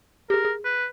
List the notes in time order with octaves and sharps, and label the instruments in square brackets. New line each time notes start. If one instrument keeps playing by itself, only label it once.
[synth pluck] G4 G#4 [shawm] A#4
[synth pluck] G#4
[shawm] B4